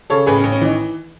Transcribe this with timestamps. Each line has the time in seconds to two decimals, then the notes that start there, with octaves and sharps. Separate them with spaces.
0.10 C#3 A4 C#5
0.26 A1 G#4 B4
0.39 C#4
0.44 A1
0.52 C#4
0.61 E3 D#4